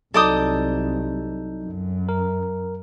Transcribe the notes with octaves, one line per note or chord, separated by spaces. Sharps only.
C2 F#3 D#4 A4 D5 D#6 G6
F#2
A#4